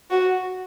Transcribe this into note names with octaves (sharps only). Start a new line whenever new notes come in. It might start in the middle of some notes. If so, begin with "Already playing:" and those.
F#4